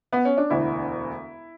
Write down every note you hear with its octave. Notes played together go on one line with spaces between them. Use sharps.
B3
C#4
D4
E1 D2 D3 E4